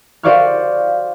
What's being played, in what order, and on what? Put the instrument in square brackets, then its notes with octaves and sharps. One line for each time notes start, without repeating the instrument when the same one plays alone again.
[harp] F#4 C5 D5 F5 C#6 F6